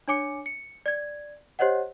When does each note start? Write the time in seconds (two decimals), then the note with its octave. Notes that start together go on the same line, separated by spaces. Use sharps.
0.08 D4 C#5 G#5 D6 C#7
0.46 C#7
0.86 D5 G#6
1.59 G4 C5 C#5 D#5 F#5